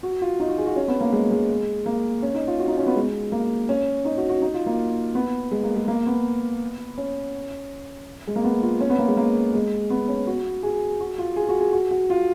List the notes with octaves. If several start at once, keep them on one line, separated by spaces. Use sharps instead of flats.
F#4
F4
D#4
F#4
G#4
F#4
C#4
B3
A#3
G#3
G#3
A#3
C#4
D#4
F4
F#4
D#4
C#4
B3
G#3
A#3
C#4
D#4
F#4
F#4
D#4
F4
A#3
B3
G#3
A#3
G#3
A#3
B3
C#4
G#3
A#3
B3
F4
C#4
B3
A#3
G#3
A#3
G#3
B3
C#4
F#4
G#4
F#4
F4
G#4
F#4
G#4
F#4
F#4
F4